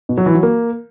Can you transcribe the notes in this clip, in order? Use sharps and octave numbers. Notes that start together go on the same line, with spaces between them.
B2
F#3
E3
F#3
A#3